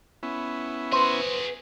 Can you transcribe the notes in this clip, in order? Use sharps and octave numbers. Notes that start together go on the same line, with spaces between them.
B3 C#4 E4
F#4 G#4 B4 C5